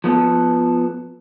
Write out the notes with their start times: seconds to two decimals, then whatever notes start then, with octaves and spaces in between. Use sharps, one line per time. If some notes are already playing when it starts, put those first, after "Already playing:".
0.04 F3 B3 A4